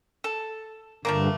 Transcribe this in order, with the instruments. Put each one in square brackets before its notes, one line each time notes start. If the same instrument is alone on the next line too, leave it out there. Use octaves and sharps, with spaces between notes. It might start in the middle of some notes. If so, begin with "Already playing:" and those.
[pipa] A4
[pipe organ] G2 D3 [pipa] F3 A3 A#3